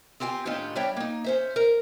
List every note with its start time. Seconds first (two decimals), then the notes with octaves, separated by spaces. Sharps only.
0.20 C4 F4 G4 F#5 G#5
0.45 A2 D#3 C#4 D4 F4 G4
0.76 G3 D4 C#5 E5 G5
0.97 A#3 D#4
1.24 C#4 C5 E5
1.56 A#4